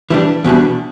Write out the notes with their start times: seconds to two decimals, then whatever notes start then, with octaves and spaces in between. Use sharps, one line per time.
0.10 E3 G3 D4
0.44 E2 B2 G3 D4